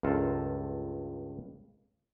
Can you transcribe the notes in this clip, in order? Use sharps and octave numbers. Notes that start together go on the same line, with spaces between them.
C#2 G2 F4 A4 A#4